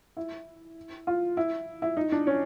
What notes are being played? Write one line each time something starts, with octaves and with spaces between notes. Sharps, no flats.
E4
F4
E4
E4
D#4
D4
C#4